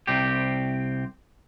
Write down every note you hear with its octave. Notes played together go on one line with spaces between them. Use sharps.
C2 C4 G4